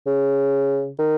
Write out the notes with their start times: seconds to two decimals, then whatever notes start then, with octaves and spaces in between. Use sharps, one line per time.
0.06 C#3
0.99 D#3